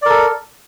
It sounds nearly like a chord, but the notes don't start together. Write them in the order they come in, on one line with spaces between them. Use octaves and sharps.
D5 A#4 A4